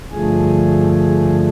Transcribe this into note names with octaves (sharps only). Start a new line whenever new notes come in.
G2 D3 F3 A3 G#4
G#4